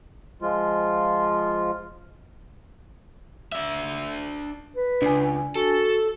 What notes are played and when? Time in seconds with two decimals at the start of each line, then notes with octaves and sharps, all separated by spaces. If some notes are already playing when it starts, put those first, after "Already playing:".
0.42 F3 G#3 F4
3.52 D4 E5
4.76 B4
5.02 C#2 D4 G#5
5.55 F#4 A4